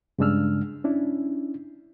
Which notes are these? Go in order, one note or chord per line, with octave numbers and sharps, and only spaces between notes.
G2 C#3 G#3 D4 E6 F6
C#4 D4 E4